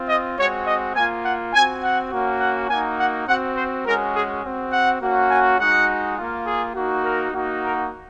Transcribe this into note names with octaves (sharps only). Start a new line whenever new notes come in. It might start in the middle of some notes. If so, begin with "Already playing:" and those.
Already playing: C4 F4
D#5
G#3 C4 F#4 C#5
D#5
A#3 F4 G#5
F#5
C4 F#4 G#5
F#5
A#3 C#4 F#4
F#5
A#3 D#4 F#4 G#5
F#5
C4 F#4 F#5
C5
G#3 C#4 F#4 A#4
G#4
C4 F#4
F#5
A#3 C#4 F#4
G#5
G#3 D#4 F#4 F#5
A#3 F4
G#4
A#3 D#4 F#4
A#4
A#3 D#4 F#4
A#4